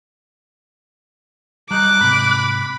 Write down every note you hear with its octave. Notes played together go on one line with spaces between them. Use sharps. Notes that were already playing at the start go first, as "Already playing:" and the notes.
G3 D#4 D6 F#6
G#2 C3 B5